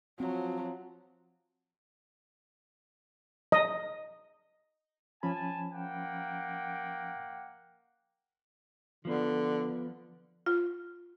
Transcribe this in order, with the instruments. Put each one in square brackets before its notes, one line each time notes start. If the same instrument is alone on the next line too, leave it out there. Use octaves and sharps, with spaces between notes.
[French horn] F3 [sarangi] F#3 [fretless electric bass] C4
[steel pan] D#5
[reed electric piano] F3 C#4 B5 [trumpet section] G#5 A5
[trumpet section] A#3 F#5 G5
[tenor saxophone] D3 [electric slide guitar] F3 B3
[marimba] F4